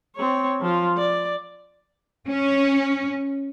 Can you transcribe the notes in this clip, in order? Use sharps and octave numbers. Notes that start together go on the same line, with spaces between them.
C4 C#5
F3 F4
D5
C#4